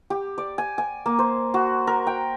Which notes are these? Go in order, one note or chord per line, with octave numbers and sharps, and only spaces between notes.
G4
D5
G#5
G#5
A#3
C5
F#4
A#4
G5